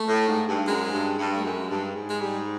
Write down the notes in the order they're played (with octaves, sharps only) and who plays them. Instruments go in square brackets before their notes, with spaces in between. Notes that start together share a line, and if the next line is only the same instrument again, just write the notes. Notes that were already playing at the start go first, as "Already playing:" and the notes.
Already playing: [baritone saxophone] A3
[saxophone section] A2
G#2
G2
[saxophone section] F#2 [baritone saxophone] G#3
[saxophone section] G#2
G2
G2
[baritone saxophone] A3
[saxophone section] F#2 [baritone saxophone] G#3
[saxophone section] G2
G#2
[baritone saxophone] G#3
G3